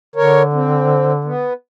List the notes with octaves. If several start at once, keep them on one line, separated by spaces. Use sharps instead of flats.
D3 A#4 C#5
C4
B3